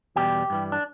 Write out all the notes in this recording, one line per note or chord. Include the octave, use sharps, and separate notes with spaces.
E2 B2 G3 G4
G2 E3 G3
D4